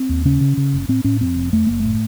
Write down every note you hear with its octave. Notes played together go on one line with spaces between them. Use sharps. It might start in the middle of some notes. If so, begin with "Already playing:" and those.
Already playing: C4
D#2
C#3 C#4
C#3
C#3
F#1
A2 C4
A2 C#4
F2 C4
F1
F2 A3
F#1 A#3
A2 A3